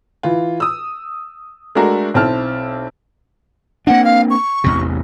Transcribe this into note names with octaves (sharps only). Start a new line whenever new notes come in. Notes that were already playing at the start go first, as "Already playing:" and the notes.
E3 F4
D#6 E6
G#3 A3 D4 F#4 A#4
B1 C4 E4 A5 F6
A#3 C4 D4 F#5
F5
C#6
A1 E2 C3